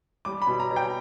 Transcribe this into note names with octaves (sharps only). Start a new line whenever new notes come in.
G3 D6
B5
B2
A#5
B2
G5